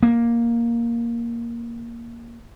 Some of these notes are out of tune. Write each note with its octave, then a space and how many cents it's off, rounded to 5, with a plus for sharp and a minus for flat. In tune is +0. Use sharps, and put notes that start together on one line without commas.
A#3 +5